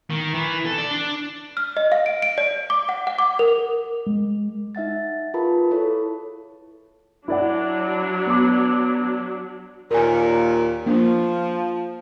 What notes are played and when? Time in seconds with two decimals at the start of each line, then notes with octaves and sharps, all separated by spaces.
0.10 D#3
0.34 E3
0.65 A4
0.78 D5
0.90 D4
1.57 F6
1.77 D#5
1.92 F5
2.06 D7
2.22 D7
2.38 D5
2.70 D6
2.89 F#5
3.07 F#5
3.19 D6
3.39 A#4
4.07 G#3
4.75 D#4 E5 F#5 A6
5.34 F4 G#4 A#4 B4 A5 B5
5.71 E4 A4 C#5
7.28 F#3 D4 E4 D5 F#5
8.26 B3 D6
9.91 D#2 A#2 A#4 G#5
10.86 F3 A#3 D4